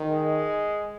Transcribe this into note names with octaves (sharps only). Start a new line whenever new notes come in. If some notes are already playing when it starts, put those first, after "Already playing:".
Already playing: D#3
G#3